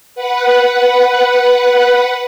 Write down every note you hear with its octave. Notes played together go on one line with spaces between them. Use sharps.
B4 F#5